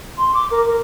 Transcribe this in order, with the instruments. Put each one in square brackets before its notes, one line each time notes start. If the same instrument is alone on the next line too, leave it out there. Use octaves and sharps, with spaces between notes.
[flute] C6
D6
A#4
A#4